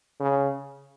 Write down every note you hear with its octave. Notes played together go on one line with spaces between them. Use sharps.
C#3